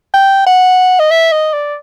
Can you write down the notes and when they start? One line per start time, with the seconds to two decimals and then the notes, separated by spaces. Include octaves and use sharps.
0.14 G5
0.47 F#5
1.00 D#5
1.11 E5
1.32 D#5
1.53 D5